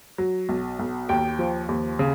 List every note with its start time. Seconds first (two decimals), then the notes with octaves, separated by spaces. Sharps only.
0.18 F#3
0.49 B1
0.79 B1
1.09 D#2 G5
1.39 F3
1.69 D#2
1.99 C#3